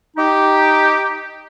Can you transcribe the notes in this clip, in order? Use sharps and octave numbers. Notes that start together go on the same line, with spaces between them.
D#4 G4